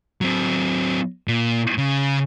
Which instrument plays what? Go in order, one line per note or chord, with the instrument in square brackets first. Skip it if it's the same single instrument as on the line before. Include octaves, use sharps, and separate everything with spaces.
[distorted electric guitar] F#3 C4
A#2
C#3